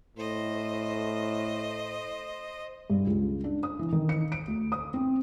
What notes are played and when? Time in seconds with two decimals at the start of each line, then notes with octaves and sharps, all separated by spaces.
0.17 A2 C5 D#5
2.90 G2
3.07 C#2
3.44 D4
3.63 D#6
3.79 E3
3.92 D#3
4.09 C#7
4.32 D7
4.48 D2
4.72 D#6
4.94 C4